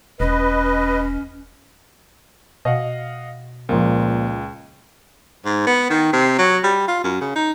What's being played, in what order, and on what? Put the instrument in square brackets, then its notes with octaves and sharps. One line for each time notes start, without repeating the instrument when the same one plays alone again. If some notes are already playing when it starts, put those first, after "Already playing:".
[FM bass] E1 [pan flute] C#4 [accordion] B4 D#5
[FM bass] B2 [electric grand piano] D#5 F5 F#5
[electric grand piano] C#2 [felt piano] A#2 F3 A#3
[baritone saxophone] G#2
B3
D#3
C3
F#3
G3
F4
F#2
C#3
D#4